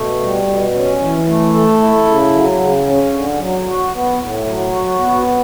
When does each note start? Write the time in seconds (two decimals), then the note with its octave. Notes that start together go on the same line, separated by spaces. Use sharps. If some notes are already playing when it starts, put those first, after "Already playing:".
Already playing: B2 A3
0.21 G3
0.47 B2
0.74 C#4
1.00 E3
1.27 A3
1.54 A4
1.80 E4
2.06 C#3
2.33 F#3
2.59 C#3
2.86 C#4
3.13 D3
3.39 F#3
3.66 F#4
3.92 B3
4.19 A2
4.45 F#3
4.72 F#4
4.99 B3